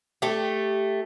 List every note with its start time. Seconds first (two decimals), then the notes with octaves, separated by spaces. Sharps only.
0.22 A3 G4